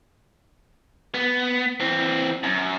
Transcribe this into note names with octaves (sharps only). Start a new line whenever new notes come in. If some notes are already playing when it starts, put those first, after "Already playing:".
B3
E3 C4
F#2